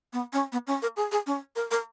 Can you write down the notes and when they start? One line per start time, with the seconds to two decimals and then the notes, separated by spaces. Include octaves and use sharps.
0.13 B3
0.33 C#4
0.52 B3
0.67 C#4
0.82 A#4
0.97 G#4
1.12 G#4
1.26 C#4
1.56 A#4
1.71 A#4